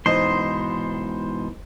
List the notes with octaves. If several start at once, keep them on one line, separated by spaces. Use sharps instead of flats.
G#2 B2 E3 D#4 C5 C6